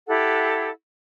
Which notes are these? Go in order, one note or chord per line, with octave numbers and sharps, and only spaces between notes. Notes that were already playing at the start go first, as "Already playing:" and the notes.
E4 G4 A4 F#5